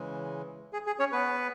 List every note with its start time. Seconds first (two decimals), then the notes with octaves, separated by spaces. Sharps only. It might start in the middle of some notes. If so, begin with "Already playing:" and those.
Already playing: C#3 E3 G#3
0.73 G#4
0.87 G#4
0.99 C#4 C#5
1.12 B3 B4